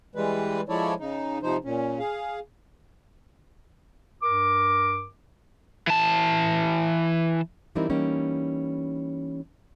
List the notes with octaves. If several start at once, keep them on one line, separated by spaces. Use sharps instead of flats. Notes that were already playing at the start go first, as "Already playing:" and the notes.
E3 G3 G#3 B4
F3 G#3 E4 A4 C#5 D5
C#3 D#4
C3 F3 D#4 C5
A#2 C#4
G#4 F5
G2 A#4 D6
E3 A5
E3 G3 C4 D#4 E4 A#4
E3 G3 A#3 C#4 D#4